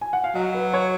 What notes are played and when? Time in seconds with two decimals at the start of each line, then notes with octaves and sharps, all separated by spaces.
0.01 G#5
0.13 F#5
0.24 F5
0.35 F#3 D#5
0.54 B4
0.74 C#5